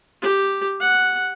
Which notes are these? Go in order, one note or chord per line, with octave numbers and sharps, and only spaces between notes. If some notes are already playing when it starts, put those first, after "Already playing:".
G4
F#5